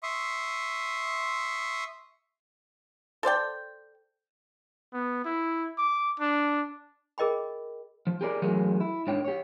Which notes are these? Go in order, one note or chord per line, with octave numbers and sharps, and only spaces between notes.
E5 C6 C#6 D#6
A4 C5 D5 G5
B3
E4
D6
D4
G#4 A#4 D#5 G5 B5
F3
G4 G#4 A#4 B4 D5
E3 F#3 A3 C#4 G#4 A#4
E4
G#2 D4 C#5 G5
G4 C#5